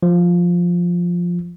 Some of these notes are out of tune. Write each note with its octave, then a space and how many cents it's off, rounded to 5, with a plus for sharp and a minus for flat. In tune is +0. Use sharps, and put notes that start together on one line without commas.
F3 +5